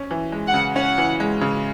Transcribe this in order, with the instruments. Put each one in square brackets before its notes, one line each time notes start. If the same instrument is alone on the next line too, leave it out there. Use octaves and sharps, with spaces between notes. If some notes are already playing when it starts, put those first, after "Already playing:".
Already playing: [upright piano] C#4
E3
G#3
[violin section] F#5
[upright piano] C#3
[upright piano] C#4 [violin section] F#5
[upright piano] E3
G#3
C#3